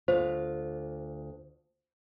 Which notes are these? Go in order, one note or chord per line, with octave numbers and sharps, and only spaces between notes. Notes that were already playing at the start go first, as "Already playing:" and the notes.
D2 F4 C5